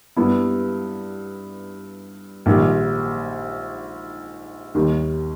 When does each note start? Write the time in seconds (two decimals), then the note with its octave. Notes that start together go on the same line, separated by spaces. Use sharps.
0.16 G2 G3 B3 E4
2.46 A#1 G#2 D#3 G3
4.75 D#2 D#3 G3